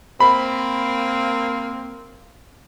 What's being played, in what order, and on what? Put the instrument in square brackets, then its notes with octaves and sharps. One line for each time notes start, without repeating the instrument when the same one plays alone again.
[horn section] A#3 C4 [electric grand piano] B5